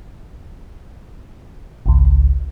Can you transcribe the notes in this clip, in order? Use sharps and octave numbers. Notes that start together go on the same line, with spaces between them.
G#1 C#2